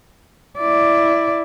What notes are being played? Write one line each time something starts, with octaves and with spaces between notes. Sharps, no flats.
E4 D5